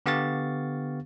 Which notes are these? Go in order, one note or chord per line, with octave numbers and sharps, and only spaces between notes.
D3 B3 G4 F5 C#6 A6